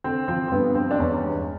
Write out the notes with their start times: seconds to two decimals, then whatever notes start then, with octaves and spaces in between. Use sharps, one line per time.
0.04 D3 C4
0.28 F3 C4
0.48 C4
0.51 G2 B3
0.75 G2 C4
0.91 D4
0.99 E2 C#4
1.23 G#3